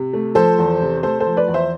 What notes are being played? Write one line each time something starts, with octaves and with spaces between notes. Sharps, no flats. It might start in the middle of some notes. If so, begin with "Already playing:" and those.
Already playing: C3
A3
F3 A4 C5
E2
C3
A3 A4 C5
A4 C5
F3
B4 D5
E2
C5 E5